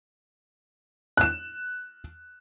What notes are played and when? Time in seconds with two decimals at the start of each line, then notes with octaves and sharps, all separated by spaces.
1.17 F#6 E7